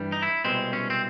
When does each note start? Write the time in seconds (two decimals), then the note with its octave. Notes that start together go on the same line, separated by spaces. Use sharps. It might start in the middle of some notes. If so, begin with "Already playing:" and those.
Already playing: G2 E3 G3
0.12 D#4
0.23 E4
0.44 C2 B2 G#3 C4
0.73 C#4
0.90 C4